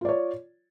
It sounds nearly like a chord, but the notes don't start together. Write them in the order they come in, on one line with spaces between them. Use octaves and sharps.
F4 D5 C#5